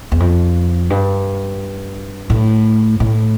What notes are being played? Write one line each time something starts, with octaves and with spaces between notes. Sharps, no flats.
E2
F2
G2
A2
A2